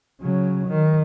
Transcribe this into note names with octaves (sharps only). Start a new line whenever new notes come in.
C#3 F#3
D#3